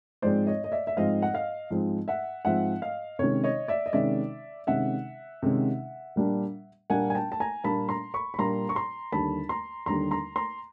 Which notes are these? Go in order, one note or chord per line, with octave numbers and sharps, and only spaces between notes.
G#2 F3 G#3 C4 C5 D5
C#5 D#5
D#5
D5 E5
E5
G#2 F3 G#3 C4 D#5 F5
F#5
D#5 F5
G#2 F3 G#3 C4
E5 F#5
G#2 F3 G#3 C4 E5 F#5
D#5 F5
C3 D#3 G#3 C#4 C#5
C#5 D#5
D5 E5
D#5
C3 D#3 G#3 C#4 D5 E5
C3 D#3 G#3 C#4 E5 F#5
C3 D#3 G#3 C#4
A#2 G3 A#3 D4
A#2 G3 A#3 D4 F#5 G#5
G#5
G5 A5
A5
G#5 A#5
A#2 G3 A#3 D4 A5 B5
A#5 C6
B5 C#6
B5
A#2 G3 A#3 D4 A#5 C6
C#6
A#5 C6
D#2 D3 G3 A5 B5
A#5 C6
D#2 D3 G3 A#5 C6
A#5 C6
A#5 C6